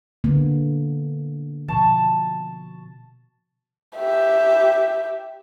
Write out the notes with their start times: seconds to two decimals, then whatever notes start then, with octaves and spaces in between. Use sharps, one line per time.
0.24 D3 A#3 B3
1.68 B2 F3 A5 C#6
3.97 G4 E5